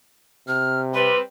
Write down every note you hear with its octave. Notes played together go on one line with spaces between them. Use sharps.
C3 F6
G3 C4 B4 C6